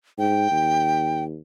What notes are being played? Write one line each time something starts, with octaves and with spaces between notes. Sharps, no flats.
G#2 G5
D#2